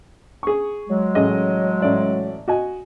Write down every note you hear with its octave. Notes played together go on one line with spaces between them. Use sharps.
G#4 C#6
F#3 G#3
A1 G#4 D#5
A1 D5 E5
F#4 D#5 G#5